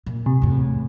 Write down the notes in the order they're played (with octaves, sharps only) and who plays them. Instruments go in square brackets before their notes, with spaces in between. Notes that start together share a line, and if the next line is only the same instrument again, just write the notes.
[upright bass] A#2
[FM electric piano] C3
[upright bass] E2 A2